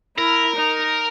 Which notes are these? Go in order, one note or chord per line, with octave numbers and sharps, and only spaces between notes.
E4 A#4
D#4